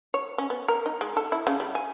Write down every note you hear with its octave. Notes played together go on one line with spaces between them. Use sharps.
C#5
C#4
B3
A#4
D#4
G#3
A4
E4
C#3
G3
G#5